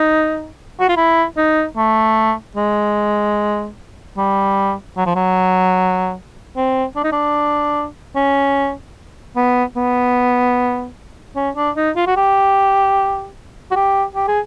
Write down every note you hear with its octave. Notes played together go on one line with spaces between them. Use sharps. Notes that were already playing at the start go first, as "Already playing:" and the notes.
Already playing: D#4
F#4
F4
E4
D#4
A3
G#3
G3
F#3
F3
F#3
C4
D4
D#4
D4
C#4
B3
B3
C#4
D4
D#4
F4
F#4
G4
F#4
G4
G4
G#4